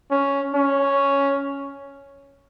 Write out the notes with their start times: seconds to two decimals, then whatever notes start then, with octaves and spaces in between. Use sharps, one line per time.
0.11 C#4
0.54 C#4